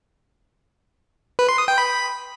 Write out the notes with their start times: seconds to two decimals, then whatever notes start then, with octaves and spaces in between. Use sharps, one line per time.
1.39 B4
1.49 C6
1.58 D#6
1.68 G5
1.78 B5